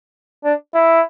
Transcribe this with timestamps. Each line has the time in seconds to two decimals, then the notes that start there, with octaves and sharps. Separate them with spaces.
0.44 D4
0.74 E4